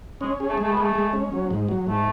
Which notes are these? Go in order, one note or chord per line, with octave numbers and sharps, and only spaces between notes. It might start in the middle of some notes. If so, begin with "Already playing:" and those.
G#3 C#4
G#4
A3
G#3
A3
B3
A3 G#4
G#3
C#4
F#3
G#2
F#3
G#2 A3